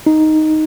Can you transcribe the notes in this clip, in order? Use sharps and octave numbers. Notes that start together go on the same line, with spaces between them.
D#4